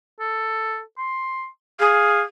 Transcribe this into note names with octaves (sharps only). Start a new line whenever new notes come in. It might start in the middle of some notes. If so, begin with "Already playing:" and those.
A4
C6
G#4 F5